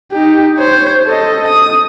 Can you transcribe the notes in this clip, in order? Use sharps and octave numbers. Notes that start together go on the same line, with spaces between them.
D#4 G4
C5 C#5
A4 D#5
D#6